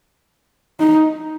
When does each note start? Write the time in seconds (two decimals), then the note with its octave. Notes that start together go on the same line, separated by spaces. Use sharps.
0.80 D#4